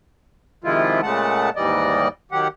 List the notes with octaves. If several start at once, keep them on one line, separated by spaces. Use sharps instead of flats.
C3 D#3 F3 G#3 E4 F4
A#2 C#3 G#3 A3 F#5 A5
D#2 G#2 E3 G3 D5 D#5
D#3 F#3 G4 F#5